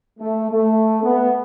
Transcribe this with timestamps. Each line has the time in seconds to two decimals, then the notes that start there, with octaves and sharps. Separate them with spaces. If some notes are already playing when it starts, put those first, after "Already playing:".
0.19 A3
0.51 A3
1.03 B3